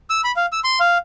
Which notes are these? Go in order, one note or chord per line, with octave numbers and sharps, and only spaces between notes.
E6
B5
F5
E6
C6
F5